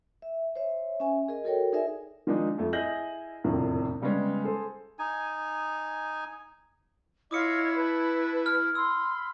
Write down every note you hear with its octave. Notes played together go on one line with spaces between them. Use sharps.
E5
C5 C#5 E5
C#4 E5 G#5
G#4 A#4 D#5
F#4 A4 A#4 C#5 G5
D#4 G#4 A#4 D5 E5 G#5
D#3 F3 G#3 D4 D#4
F2 A3
E4 G#4 D#5 G6 A#6 F#7
E1 F2 A2 C3 D#3
C#3 G3 G#3 B3 C#4
G#4 A4 C5
D#4 G#5
E4 F4 C#5 D#5 D6 D#6 C#7
B4 A5
F6
B5 C6 E6